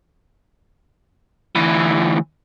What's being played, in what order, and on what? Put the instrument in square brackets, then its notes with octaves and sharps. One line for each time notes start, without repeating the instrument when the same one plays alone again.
[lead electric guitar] D2 E3